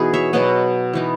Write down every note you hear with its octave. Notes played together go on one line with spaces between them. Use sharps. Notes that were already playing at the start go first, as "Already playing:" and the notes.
Already playing: B2 E3 B3 D#4 F#4 G#4
C#5 E5
B2 F#3 B3 D#5 F#5
E3 B3 D#4